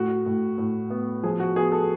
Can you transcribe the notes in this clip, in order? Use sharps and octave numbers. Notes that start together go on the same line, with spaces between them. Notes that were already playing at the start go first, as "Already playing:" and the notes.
Already playing: A2 F#4
A2
A2
B3
F3 G#4
F#4
B3 G#4
A4